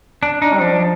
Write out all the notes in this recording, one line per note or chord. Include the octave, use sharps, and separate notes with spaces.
D4
D4 D#4
G3
F3 D4